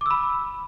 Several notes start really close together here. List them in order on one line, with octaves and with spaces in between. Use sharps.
D6 E6 B5